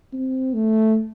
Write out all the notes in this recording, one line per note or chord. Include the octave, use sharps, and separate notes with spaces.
C4
A3